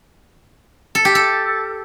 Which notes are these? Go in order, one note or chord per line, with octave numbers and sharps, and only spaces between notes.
A4
G4
A4